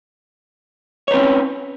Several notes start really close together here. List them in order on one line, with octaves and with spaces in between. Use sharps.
C#5 B4 C4 C#4